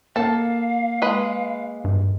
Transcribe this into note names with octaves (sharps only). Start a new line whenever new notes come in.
A#3 A4 F5 A5
G#3 B4
G2